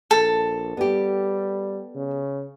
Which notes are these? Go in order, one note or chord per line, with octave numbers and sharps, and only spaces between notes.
A#1 A4
G3 B3 G4
C#3